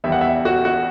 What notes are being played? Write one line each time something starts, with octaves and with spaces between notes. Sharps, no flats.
E2 D#3 G3 E5
F#5
E5
F#4
F#4